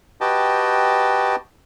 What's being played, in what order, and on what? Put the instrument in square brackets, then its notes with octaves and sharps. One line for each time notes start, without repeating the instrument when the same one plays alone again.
[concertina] F#4 G4 B4 D#5 G5 A5